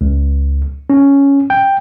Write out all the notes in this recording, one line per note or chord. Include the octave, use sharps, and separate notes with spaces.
C#2
C#4
G5